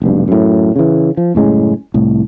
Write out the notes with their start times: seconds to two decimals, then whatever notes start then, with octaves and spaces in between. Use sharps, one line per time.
0.02 F1 B1 G2
0.28 F#2 A2
0.76 C#3 E3
1.17 F3
1.35 F#1 A2 G#3 C#4
1.94 C2 A2